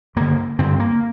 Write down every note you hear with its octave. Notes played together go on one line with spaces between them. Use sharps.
G2 D3 A#3
G2 D3 C4
A#3